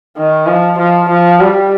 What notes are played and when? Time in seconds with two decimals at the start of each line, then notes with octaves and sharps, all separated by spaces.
0.17 D#3
0.47 F3
0.78 F3
1.09 F3
1.40 G3